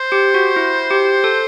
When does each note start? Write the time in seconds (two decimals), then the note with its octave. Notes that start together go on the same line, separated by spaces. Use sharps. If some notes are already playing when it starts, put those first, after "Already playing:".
Already playing: C5
0.12 G4
0.34 F#4
0.56 E4
0.91 G4
1.24 A4